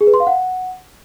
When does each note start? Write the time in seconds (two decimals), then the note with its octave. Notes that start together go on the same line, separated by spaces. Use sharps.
0.01 G#4
0.07 B4
0.14 C6
0.20 F5
0.27 F#5